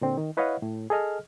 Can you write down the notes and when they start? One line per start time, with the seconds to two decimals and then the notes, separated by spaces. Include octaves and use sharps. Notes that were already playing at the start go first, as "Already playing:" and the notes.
0.01 A#2 D3 C4
0.18 D#3
0.37 E4 B4 C#5 D#5 F5 F#5
0.62 A2
0.90 G#4 A4 D#5 F6